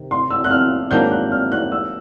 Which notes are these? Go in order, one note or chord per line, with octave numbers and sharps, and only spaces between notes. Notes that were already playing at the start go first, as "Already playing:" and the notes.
Already playing: C3 D#3
C6
E6
F#6
F6
G#2 D#3 F#3 A#3 D4 G6
F#6
F6
F#6
E6